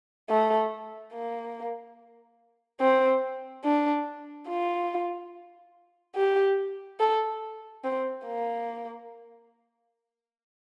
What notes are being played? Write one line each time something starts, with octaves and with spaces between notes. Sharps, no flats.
A3
A#3
C4
D4
F4
G4
A4
C4
A#3